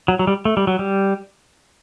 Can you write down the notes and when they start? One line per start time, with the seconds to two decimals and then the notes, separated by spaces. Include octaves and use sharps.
0.08 F#3
0.19 F#3
0.27 G3
0.45 A3
0.57 G3
0.67 F#3
0.79 G3